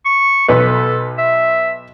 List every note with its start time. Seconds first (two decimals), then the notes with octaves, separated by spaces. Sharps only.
0.05 C#6
0.48 B1 A4 B4
1.18 E5